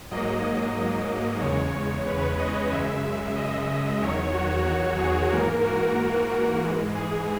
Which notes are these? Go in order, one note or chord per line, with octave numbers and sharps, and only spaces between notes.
G#2 F#3 A#3 D#5
D#5
D#5
E2 C#3 G#3 C#5
B4
D#5
F#2 C#3 G#3 E5
D#5
D#5
E2 D#3 F#3 C#5
F#4
F#4
G#4
G#2 E3 A#3 A#4
F#4
A#4
A#4
G#2 E3 G#3
G#4